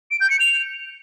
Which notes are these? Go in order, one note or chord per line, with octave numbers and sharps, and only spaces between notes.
D7
G6
C#7
F7